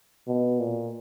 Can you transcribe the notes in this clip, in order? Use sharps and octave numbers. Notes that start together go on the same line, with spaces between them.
B2
A#2